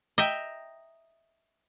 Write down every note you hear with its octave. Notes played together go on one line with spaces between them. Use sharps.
D#5 E5 G5 A#5